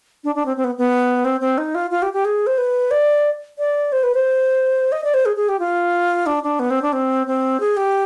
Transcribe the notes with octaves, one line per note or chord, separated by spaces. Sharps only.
D4
D4
C4
C4
B3
B3
C4
C4
D#4
F4
F4
G4
G4
G#4
C5
B4
D5
D5
C5
B4
C5
D#5
D5
C5
G#4
G#4
G4
F4
D4
D4
B3
C4
D4
C4
C4
G#4
G4